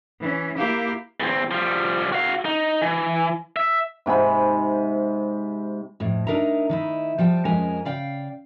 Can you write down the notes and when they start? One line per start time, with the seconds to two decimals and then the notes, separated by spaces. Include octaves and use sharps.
0.19 E3 C#4
0.56 A#3 E4 G4 A#4 F5
1.20 E2 C4
1.51 F3 G3
2.12 F#4 F5
2.45 D#4
2.82 E3
3.56 E5
4.06 G#2 C3 G#5 B5
6.00 F2 A2
6.27 D4 D#4 A#4 E5 A#5
6.69 D#3 D#4 E4
7.18 F3 G3 G5 A5
7.45 F2 G#3 C#4 A#4 G#5 A#5
7.85 C#3 D5 F5 G5